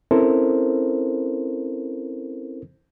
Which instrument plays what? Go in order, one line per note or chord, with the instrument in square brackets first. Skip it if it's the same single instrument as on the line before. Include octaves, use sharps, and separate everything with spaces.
[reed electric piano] C4 C#4 E4 A4 A#4 C5